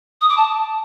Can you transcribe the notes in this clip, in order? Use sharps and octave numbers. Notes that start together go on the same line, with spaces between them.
D#6
D6
A5